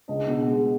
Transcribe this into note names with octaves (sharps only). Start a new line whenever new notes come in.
C#2 D#5
B2
G#3